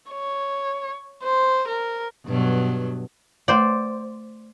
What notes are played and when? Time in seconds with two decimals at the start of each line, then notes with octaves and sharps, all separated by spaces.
0.11 C#5
1.23 C5
1.68 A#4
2.26 G2 B2 F#3
3.48 A3 C5 D5 F5